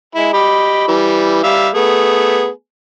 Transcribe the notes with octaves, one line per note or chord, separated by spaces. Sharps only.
G#3 E4
G4 D#5 B5
E3 G3
G3 E5 F5
A3 B3 G#4